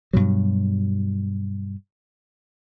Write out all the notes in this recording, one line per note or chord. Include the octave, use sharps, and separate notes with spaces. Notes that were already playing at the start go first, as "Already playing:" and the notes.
G2 B2 F#3